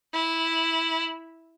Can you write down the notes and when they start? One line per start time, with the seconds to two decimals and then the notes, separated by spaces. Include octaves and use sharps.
0.13 E4